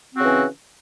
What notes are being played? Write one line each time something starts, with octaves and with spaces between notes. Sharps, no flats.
C#3 E3 C4 C#4 F#4